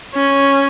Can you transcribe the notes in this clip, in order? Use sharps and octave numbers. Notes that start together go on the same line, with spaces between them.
C#4